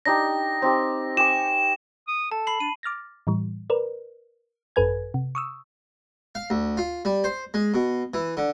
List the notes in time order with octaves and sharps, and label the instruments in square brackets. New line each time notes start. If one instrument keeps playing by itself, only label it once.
[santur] D4 D#4 G4 [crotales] A#6
[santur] C4 D#4 G4
[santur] G4 G#5 C#6 [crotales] E7
[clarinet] D#6
[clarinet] A4 [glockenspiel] A5
[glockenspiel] B5 C7 F#7
[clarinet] D4 [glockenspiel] D#7
[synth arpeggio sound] D6 F6 A6 A#6
A2 E3 G3
A#4 B4 D5
G#1 F#2 A4 B4 G#5 G#6
C3
C#6 D#6 E6
[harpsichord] F5
D2
F4
G3
C5
G#3
B2
E3
D3